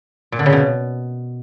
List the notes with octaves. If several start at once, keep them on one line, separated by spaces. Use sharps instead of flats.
A#2
D3
C#3
B2